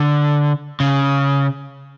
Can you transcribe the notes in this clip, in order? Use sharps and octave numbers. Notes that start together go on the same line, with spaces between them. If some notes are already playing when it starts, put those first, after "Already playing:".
Already playing: D3
C#3